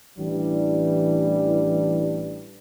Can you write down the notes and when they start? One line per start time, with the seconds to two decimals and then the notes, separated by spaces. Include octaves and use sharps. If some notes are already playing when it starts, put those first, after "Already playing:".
0.18 A1 E3 G3 D4